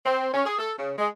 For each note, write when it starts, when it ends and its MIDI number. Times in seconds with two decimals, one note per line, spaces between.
0.06 0.29 60
0.34 0.44 61
0.46 0.58 68
0.59 0.72 69
0.78 0.91 49
0.98 1.08 56